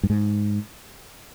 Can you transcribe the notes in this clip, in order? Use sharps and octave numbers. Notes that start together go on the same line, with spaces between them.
G2
G#2